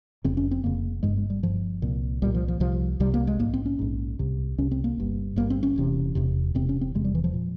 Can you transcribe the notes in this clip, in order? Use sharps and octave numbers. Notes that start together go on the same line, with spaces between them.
F1 F2 C#3 C4
C#4
C4
F1 F2 C#3 A#3
G1 G2 G#3
G#3
G3
G1 G2 F3
C2 A#2
C2 A#2 G3
F3
F3
C2 C3 F3
C2 C3 G3
A#3
G#3
A#1 G#2 A#3
C4
C#4
A#1 G#2
C2 C3
C2 C3 C#4
C4
A#3
G1 G2
G1 G2 A#3
C4
C#4
E1 E2 C3
E1 E2 C3
E1 E2 C3 C4
C#4
C4
E1 E2 C3 G#3
G3
E3
F3
A#2